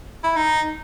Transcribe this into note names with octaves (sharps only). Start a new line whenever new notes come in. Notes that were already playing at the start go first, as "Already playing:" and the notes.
E4
D#4